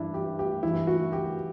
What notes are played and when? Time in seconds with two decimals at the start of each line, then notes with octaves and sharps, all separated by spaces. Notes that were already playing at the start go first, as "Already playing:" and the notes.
Already playing: G2 E3 D4 E4
0.14 G4
0.39 G4
0.63 G2 E3 E4
0.87 F#4
1.13 G4